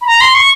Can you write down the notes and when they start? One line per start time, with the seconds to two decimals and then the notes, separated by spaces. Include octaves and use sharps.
0.01 B5
0.07 A#5
0.21 C6
0.35 C#6